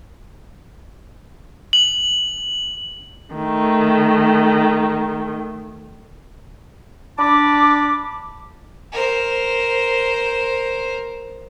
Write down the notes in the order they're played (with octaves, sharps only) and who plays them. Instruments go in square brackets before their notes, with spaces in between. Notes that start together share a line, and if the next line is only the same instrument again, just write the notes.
[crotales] F#7
[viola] D#3 A3
[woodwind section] D4 A5 B5 D6
[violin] A#4 C5